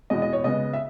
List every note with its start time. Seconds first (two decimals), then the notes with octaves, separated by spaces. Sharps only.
0.10 E2 B2 G#3 D#5
0.22 D#5
0.33 C#5
0.44 C#3 G#3 B3 D#5
0.73 E5